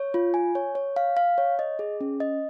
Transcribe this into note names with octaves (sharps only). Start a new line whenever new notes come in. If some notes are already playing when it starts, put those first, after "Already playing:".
Already playing: C#5
F4
G#5
C#5
C#5
F5
F5
C#5
D#5
G#4
C#4
D#5